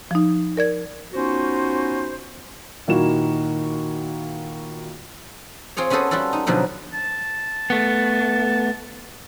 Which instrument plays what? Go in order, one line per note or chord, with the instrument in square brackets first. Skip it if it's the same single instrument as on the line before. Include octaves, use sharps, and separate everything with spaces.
[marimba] F3 D#4
A#4 D5 G#6
[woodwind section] B3 C#4 D#4 F4 F#4 C5
[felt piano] A#2 D#3 A#3 E4 F#4 E7
[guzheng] C4 F4 G#4 C#5
B3 C#4 F#4 G#4 A4 C5
G3 F4 F#4 A4
D#4
B2 D3 F3 F#3 D#4
[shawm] A5
[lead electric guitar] A3 B3